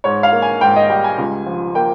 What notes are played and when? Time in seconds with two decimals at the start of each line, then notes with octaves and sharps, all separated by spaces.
0.04 G#2 C#5
0.23 F5
0.33 A#3
0.42 G#5
0.61 G#2 G5
0.76 D#5
0.90 G3 G5
1.04 G#5
1.18 C#2
1.46 F3
1.75 A#3 G5